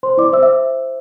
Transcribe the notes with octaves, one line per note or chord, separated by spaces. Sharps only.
C5 C6
E4 D5 D6
C5 E5 E6
E5 E6